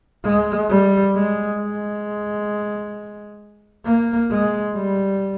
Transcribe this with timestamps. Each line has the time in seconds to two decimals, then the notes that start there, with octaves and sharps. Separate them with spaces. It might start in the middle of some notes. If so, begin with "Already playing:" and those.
0.25 G#3
0.69 G3
1.15 G#3
1.60 G#3
3.86 A#3
4.31 G#3
4.76 G3